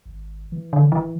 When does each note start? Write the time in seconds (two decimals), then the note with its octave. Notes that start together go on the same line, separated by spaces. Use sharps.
0.06 G#1
0.52 E3
0.73 D3
0.92 D1 E3